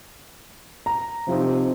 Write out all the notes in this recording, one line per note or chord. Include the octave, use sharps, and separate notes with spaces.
A#5
C3 F3 C4 D#4